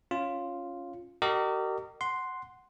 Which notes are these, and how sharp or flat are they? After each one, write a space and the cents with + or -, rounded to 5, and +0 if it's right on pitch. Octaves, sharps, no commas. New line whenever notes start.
C#4 +0 F4 +0
G4 -45 A#4 -30 D#5 -35
F#5 +0 C6 +0